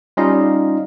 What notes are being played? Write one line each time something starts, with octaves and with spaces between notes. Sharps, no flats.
G3 C#4 D#4 F4 D#5 F5